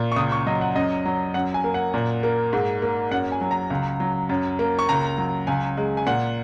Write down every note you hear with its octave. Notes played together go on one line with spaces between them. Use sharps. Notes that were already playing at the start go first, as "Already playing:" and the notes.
Already playing: A#2
C#6
C#2 D#6
C#6
F#3 D#5
F#5
F#2 D#5
F#3
F#2 F#5
G#5
A#3
F#5
A#2
A#3
G#2
A#3
F#2 F#5
G#5
F#3
A#5
C#2
F#3
F#2
A#3
C#6
C#2 A#5
F#3
C#2 G#5
G#3
G#5
A#2 F#5